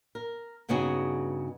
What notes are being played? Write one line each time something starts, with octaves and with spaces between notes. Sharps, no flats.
A#4
G2 C#3 B3 D#4 F#4 G#4